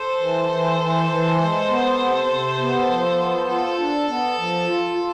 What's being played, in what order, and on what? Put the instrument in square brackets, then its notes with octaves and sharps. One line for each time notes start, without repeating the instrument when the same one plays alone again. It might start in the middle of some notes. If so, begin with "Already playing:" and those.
Already playing: [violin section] A4 C5
[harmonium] E3
E3
E3
E3
G#3
B3
C3
C3
B3
F3
B3
[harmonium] F4 [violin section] A4
[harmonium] D4
B3
F3
F4
F4